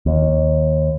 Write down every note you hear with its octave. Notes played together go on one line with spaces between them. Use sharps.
D#2